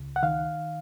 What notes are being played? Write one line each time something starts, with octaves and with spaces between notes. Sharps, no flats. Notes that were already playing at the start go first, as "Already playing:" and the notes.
Already playing: C#2
F#5
D#3 F5